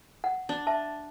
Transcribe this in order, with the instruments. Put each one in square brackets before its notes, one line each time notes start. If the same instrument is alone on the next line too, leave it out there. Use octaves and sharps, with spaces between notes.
[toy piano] F#5
[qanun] D4
[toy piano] E5 A5